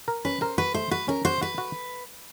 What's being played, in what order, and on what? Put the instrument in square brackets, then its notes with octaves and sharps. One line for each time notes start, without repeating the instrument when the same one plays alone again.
[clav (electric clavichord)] A#4
[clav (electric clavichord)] C#4 [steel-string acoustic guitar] B4
[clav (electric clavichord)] A#4 [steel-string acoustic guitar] C5
[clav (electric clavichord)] F#4 [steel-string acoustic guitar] B4
[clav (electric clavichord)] A3 [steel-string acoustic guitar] C5
[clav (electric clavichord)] F#4 [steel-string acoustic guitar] B4
[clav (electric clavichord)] C#4 [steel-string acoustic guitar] A#4
[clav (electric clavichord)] F#4 [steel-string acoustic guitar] C5
[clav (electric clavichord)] F#4 [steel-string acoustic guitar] B4
[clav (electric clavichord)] F#4